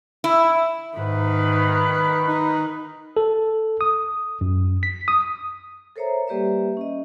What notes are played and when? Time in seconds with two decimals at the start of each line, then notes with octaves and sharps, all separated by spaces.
0.24 E4
0.98 G#2 D#3 B4
2.28 D#4
3.17 A4
3.81 D#6
4.41 F#2
4.83 B6
5.08 D#6
5.96 A4 A#4 C5 C#5 E5 A#5
6.27 G3 A#3 G4 B4 D5 E5
6.77 C#4 D#5